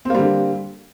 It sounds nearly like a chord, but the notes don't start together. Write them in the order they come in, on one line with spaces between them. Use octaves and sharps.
C4 A#3 G3 D3